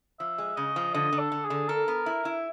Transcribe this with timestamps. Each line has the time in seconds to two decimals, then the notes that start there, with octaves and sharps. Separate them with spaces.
0.19 F3 E5
0.38 G#3
0.57 C#3 D#5
0.76 F3
0.94 D3 D#5
1.12 D3
1.19 A4
1.32 D3
1.44 G#4
1.50 D3
1.68 A4 A#4
1.88 B3
2.06 E4
2.25 E4